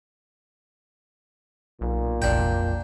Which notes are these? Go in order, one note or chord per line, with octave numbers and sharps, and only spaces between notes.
B1 A#2
F1 A#1 D4 G5